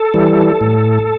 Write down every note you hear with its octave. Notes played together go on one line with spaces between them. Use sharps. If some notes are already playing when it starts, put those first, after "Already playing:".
Already playing: A4
E3 G3
A2